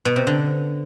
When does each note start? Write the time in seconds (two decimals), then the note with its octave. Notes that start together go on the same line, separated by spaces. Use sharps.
0.05 B2
0.16 C3
0.27 D3